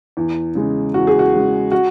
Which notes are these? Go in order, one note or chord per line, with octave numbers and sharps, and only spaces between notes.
E2
C#3 G#3
E2 F#4
G#4
F#4
C#3 G#3
F#4